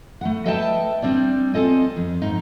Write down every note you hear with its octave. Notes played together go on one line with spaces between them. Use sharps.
A3 E4 F#5
A4 B4 D#5 E5 G5 A5
G3 C4 D4 D5
C4 F4 A4 D#5 G#5
F2
G#2 D#4